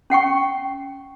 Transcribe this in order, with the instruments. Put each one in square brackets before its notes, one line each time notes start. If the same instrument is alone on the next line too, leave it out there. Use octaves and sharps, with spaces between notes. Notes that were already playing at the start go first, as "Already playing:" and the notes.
[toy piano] C#4 F#5 G5 C#6